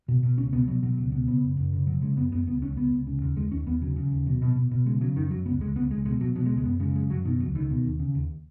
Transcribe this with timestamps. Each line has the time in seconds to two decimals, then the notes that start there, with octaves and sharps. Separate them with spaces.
0.08 B2
0.23 B2
0.38 C#2 C#4
0.52 B2 B3
0.68 B2 F#3
0.83 B2 F#3
0.98 C#2
1.12 B2
1.28 C#3 B3
1.43 F#2
1.57 F#2
1.72 C#3
1.87 C#3 F#3
2.02 C#3 G#3
2.17 F#2 B3
2.31 F#2 B3
2.47 C#2 B3
2.62 C#2 C#4
2.76 C#2 B3
2.92 C#2
3.07 C#3
3.22 D#2
3.36 D#2 G#3
3.51 D#2 C#4
3.66 D#2 B3
3.82 C#3 F#3
3.96 C#3
4.11 D#2
4.26 B2 F#3
4.42 B2
4.56 B2
4.71 B2
4.86 C#3 G#3
5.01 C#3 F#3
5.16 F#2 D#3
5.31 F#2 F#3
5.45 C#2 B3
5.61 C#2 G#3
5.76 C#2 B3
5.90 C#2 G#3
6.05 B2 G#3
6.21 B2 F#3
6.35 B2 F#3
6.46 G#3
6.50 C#2
6.57 G#3
6.65 F#2 B3
6.80 C#3 G#3
6.95 F#2 G#3
7.10 F#2 F#3
7.25 B2 D#3
7.40 C#2 F#3
7.55 C#2 D#3
7.70 B2
7.85 D#2
7.99 C#3
8.15 D#2